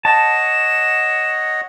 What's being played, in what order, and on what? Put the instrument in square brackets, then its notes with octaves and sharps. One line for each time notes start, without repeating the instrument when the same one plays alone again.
[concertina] C#5 D#5 F#5 [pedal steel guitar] A5 [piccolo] E7